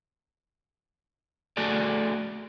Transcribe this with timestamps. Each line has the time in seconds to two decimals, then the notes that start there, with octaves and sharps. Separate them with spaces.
1.57 A3 F#4 G#4 A4 D5